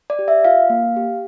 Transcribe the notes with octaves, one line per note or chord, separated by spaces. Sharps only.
D5
G4
E5
F4 F5
A#3
G4